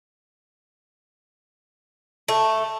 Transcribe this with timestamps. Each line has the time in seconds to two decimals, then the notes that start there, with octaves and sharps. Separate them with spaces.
2.28 A3